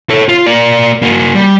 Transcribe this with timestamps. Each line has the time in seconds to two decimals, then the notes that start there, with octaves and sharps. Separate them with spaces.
0.10 A4 C#5
0.29 F4
0.46 A#3 D5
1.02 A#3 F#4
1.35 G3